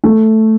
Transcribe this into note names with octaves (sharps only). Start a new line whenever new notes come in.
A3